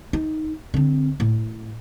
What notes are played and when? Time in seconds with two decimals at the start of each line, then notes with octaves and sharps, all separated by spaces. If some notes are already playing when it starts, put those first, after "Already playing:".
0.13 D#4
0.74 D3 C4
1.20 A2